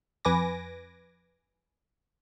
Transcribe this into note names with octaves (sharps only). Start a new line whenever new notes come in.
F2 B4 G#5 D6 A#6